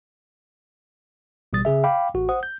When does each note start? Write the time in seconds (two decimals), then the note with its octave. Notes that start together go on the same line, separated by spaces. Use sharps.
1.53 A1 B2 G3 D#6 A6
1.65 C#3 G#4 E5
1.84 F5 G5 B5 D6
2.14 A1 F#4
2.29 C5 F#5 D#6
2.43 G6